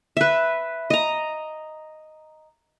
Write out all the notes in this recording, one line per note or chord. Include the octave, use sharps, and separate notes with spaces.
B4 E5
D#5 A#5